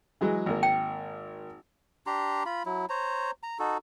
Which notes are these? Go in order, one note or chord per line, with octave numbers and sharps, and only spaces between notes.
E3 F#3 G#3
G#1 A#3
G5
D4 G4 A#5 C6
F4 B5
F#3 E4
C5 C#5 A#5
A#5
D#4 F#4 A4